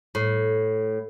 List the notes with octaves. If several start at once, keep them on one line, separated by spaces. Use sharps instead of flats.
A2